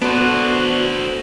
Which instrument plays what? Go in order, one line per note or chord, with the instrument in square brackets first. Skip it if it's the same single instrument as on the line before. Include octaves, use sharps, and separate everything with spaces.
[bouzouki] A2 A4 D5 [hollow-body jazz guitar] B3 [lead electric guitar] D4 C5 [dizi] F#4